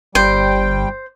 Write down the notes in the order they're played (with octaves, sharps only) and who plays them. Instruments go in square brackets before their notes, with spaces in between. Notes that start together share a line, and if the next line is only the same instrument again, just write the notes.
[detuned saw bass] G1 [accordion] G3 G5 [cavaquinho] C5